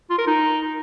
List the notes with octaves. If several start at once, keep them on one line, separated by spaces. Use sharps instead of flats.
F4
A#4
D#4